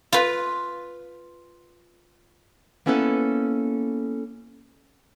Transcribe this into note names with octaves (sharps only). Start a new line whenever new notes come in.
F4 B4
A#3 B3 C#4 E4 A4 B4